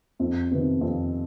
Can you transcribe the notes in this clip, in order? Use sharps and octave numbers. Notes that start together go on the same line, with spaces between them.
F2
C3 D#3 B3
F2